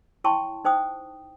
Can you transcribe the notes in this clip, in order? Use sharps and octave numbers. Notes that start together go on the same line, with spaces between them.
E4 C#5 G5 A5 C6 C#6
D#4 C5 G5 D#6